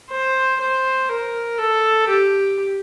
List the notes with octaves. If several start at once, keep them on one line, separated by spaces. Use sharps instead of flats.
C5
C5
A#4
A4
G4